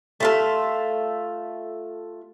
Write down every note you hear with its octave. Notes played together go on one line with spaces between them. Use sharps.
A3 F4 A4